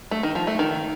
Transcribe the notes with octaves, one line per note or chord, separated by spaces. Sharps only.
A3
D#3
F3
A3
D#3